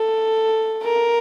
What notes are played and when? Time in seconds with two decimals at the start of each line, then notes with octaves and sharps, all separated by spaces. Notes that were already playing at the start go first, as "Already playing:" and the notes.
Already playing: A4
0.83 A#4